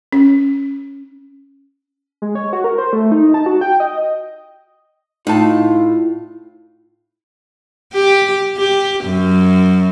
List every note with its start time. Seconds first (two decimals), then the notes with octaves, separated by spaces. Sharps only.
0.13 C#4
2.22 G#3
2.35 C#5
2.53 F#4
2.64 A#4
2.78 C5
2.93 A3
3.12 D#4
3.34 A5
3.46 F#4
3.61 G5
3.80 D#5
5.27 A2 D#4 F4 A5
7.94 G4
8.57 G4
9.05 F#2